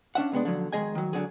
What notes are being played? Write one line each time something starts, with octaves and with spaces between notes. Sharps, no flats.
C#4 D4 E5 F#5
C3 G#3 B3 D4
D3 F3 F#3
D#3 G3 G#3 G#4 D#5 G#5
D#3 F#3
D3 F#3 G#4